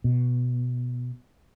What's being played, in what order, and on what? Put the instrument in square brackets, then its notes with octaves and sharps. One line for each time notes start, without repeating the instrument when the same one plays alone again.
[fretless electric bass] B2